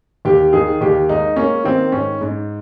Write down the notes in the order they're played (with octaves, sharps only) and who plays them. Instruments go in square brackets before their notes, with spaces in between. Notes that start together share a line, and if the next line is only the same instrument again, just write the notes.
[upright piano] D#2 G4
D#3 G#4
D#2 G4
G#3 D#4
A#3 C#4
D#3 C4
G#2 C#4
G#2